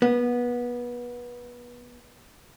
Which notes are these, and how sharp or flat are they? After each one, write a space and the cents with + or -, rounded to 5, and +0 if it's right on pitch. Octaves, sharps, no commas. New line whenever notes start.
B3 -25